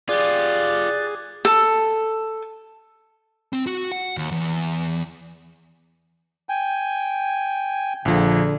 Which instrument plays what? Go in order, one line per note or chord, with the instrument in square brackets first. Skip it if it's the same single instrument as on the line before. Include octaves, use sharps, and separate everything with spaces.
[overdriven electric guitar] F4 G4 [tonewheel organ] G#4 [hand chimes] D5 [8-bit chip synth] D6 F#6 A6
[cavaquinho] A4
[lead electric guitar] C4
F#4
F#5
D#2
E2
[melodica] G5 G#5
[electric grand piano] A#1 F3 [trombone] D3